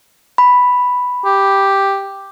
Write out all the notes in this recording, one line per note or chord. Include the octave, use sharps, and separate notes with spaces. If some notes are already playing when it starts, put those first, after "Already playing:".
B5
G4